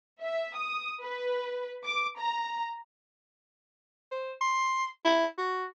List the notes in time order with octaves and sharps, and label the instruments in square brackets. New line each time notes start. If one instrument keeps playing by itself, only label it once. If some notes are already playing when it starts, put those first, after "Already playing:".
[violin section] E5
D#6
B4
D6
A#5
[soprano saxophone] C5
C6
E4
F#4